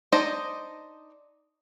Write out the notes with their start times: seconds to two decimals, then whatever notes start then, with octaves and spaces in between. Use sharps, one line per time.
0.12 D4 D#4 C5 D#5 A#5